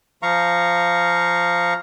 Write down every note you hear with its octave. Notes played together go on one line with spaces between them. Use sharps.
F3 F5 A#5 C#6